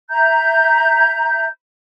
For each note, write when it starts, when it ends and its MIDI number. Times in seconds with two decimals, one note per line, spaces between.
0.10 1.45 76
0.10 1.45 82
0.10 1.45 91